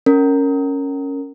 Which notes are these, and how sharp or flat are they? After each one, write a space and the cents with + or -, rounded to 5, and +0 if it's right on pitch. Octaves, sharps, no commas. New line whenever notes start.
C#4 +0 A#4 -15